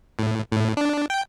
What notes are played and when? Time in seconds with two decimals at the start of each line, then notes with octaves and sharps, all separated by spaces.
0.19 A2
0.52 A2
0.77 D4
1.10 G5